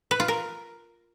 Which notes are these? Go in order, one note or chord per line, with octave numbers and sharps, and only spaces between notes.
B4
F4
A#4